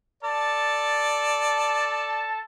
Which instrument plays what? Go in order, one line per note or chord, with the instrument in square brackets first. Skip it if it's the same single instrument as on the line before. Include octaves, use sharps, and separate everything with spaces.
[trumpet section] A4 A5 [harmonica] D5